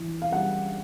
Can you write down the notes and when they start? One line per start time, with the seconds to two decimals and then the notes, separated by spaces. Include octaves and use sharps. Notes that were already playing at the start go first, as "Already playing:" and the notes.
Already playing: E3
0.22 F5
0.32 G3 F#5